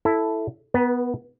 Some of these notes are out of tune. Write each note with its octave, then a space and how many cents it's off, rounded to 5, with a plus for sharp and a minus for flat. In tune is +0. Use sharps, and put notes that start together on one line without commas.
E4 +0 A4 +0
B3 +0 B4 -40 G5 +25